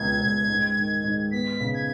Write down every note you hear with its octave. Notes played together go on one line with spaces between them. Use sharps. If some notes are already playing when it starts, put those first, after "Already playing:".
Already playing: C#2 B2 G#6
C#2
G#2
D#3
G#2
B3 B6
C#3
G#6